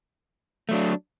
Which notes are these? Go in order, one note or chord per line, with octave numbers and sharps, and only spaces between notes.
F#3 A3 D4